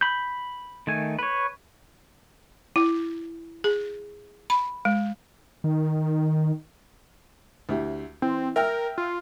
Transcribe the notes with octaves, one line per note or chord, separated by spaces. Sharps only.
B5 G6
D#3 A3 G#5
B4 C#5
E4
G#4
B5
G#3
D#3
D2 E4 G4
E3 C4
A#4 E5 G5 F6
F4